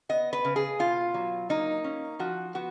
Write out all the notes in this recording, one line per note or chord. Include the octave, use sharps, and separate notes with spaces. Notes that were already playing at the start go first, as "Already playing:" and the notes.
B3 D#5
B4
C#3
G#4
B2 F4
F#3
A#3 D#4
C#4
F3 F#4
B3 F#4